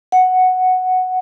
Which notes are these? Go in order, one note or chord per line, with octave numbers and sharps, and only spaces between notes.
F#5